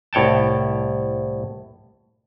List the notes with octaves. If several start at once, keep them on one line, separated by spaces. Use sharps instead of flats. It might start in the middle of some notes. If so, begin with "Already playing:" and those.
C2 A2 C#5 G5 A5